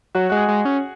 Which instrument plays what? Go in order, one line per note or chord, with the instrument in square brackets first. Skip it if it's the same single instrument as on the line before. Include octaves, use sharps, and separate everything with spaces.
[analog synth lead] F#3 [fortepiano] F#4
[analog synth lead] G#3 [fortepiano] F#4
[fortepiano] G#4
[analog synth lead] G#3
C#4